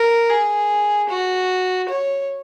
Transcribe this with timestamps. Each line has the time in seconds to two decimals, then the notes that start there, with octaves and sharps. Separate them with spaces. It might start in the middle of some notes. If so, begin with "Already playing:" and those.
Already playing: A#4
0.30 G#4
1.09 F#4
1.89 C#5